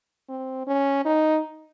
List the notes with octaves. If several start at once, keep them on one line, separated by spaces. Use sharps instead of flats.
C4
C#4
D#4